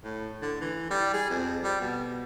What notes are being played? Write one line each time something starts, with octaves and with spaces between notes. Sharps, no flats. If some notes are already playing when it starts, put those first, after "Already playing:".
A2
D3
E3
G3
G#4
F2
G3
B2